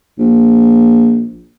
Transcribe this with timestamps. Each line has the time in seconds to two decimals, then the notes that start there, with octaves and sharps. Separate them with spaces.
0.18 A#1